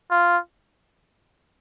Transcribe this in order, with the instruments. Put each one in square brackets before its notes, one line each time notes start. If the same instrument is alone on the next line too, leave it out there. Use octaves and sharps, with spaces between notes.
[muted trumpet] F4